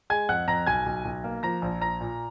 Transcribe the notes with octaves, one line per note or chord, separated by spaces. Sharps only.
G#3 G#5 G#6
F2 F#5 F#6
F2 A#5 A#6
B1 G#5 G#6
B1
B1
A#3
F3 A#5 A#6
A#1
A#1 A#5 A#6
A#2